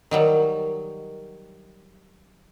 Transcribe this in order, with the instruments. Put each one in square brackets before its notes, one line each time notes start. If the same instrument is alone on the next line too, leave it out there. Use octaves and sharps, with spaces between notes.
[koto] D#3 F#3 G3